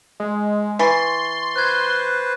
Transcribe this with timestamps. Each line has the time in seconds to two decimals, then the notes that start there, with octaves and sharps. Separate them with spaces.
0.20 G#3
0.79 E3 C6 C#6 A6 C7
1.56 B4 C5 F#6 G#6